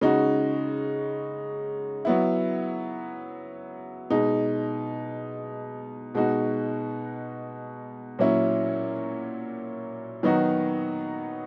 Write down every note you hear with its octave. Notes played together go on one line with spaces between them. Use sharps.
C#3 G#3 D#4 F#4
F#3 B3 E4
B2 G#3 D#4
B2 G#3 D#4 F#4
A#2 F#3 C#4 E4
D#3 F#3 B3 D#4 F#4